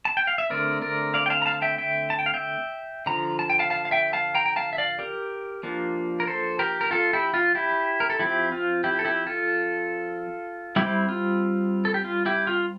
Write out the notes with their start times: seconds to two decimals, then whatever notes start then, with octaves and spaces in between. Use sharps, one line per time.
0.05 A5
0.17 G5
0.27 F5
0.38 E5
0.50 D3 A3 C4 A#4 D5
0.82 A#4 D5
1.14 D5 F5
1.26 G5
1.30 F5 A5
1.42 A#5
1.46 F5 A5
1.62 E5 G5
1.78 E5 G5
2.10 A5
2.19 G5
2.26 F5
2.34 E5 G5
3.06 D3 F3 A#5
3.39 A5
3.50 G5
3.59 F5 A5
3.70 F5 A5
3.85 F5
3.91 E5 G5
4.13 F5 A5
4.35 G5 A#5
4.46 G5
4.56 F5 A5
4.73 E5
4.78 D5 F5
4.99 G4 A#4
5.63 F3 A#3 D4
6.20 A#4
6.27 A4 C5
6.59 G4 A#4
6.81 A#4
6.91 F4 A4
7.13 E4 G4
7.34 F4
7.55 E4 G4
8.00 A#4
8.10 A4
8.19 F3 C4 E4 G4
8.52 F4
8.84 E4 G4
8.99 A4
9.05 E4 G4
9.27 F4 A4
10.76 G3 C4 E4 G4
11.09 F4
11.85 A4
11.94 G4
12.04 F4
12.26 E4 G4
12.47 F4